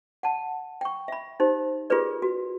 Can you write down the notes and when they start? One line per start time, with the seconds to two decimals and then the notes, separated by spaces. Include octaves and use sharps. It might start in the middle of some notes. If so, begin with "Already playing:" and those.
0.23 F#5 A5
0.81 G5 C#6
1.08 E5 B5
1.40 D#4 G4 C5
1.90 F4 G4 G#4 A#4 B4 D5
2.22 F#4